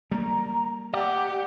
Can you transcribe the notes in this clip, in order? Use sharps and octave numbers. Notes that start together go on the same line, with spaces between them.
G3 A3 A#3 A#5
G4 D5 F#5